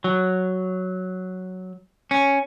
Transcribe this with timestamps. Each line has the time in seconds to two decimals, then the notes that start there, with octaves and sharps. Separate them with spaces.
0.04 F#3
2.11 C#4